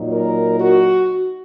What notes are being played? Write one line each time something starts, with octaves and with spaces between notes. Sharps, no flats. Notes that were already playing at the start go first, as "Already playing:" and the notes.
Already playing: A#2 F#3 D#4
A#4
F#4